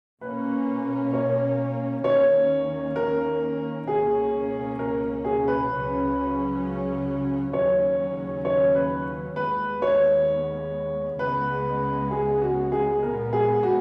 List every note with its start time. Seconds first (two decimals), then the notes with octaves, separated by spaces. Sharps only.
0.21 B2 A#3 C#4 B4
1.13 C#5
2.04 D#2 D#3 A#3 C#4 C#5
2.96 A#4
3.87 C#2 B2 A#3 C#4 G#4
4.79 A#4
5.25 G#4
5.48 B4
5.70 C#2 C#3 F#3 C#4
7.53 D#2 C#3 F#3 C#4 C#5
8.45 C#5
8.75 B4
9.36 D#2 D#3 G#3 B3 B4
9.82 C#5
11.19 C#2 C#3 G#3 B3 B4
12.11 G#4
12.42 F#4
12.72 G#4
13.02 A#2 G#3 B3 A#4
13.33 G#4
13.63 F#4